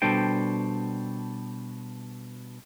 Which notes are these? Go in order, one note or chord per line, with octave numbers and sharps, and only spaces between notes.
B2 G3 D4 A4 C5 G5